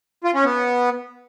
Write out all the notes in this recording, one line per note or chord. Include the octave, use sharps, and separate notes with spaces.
F4
C#4
B3